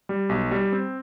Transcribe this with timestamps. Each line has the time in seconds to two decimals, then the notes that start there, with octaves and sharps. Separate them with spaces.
0.09 G3
0.29 B1
0.51 G3
0.72 C4